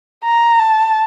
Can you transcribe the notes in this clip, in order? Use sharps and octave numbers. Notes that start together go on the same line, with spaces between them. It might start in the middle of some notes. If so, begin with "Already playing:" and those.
A#5
A5